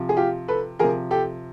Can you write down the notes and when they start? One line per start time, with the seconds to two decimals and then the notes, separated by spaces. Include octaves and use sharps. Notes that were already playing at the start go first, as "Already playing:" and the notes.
Already playing: C3 F3
0.09 G#4
0.17 F4 G4
0.48 A4 B4
0.79 C3 F3 G#4 A#4
1.11 G4 A4